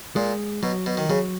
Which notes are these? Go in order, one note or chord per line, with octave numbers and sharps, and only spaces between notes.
A#2 G#3
B2 F#3
B2
D#3
C#3 F#3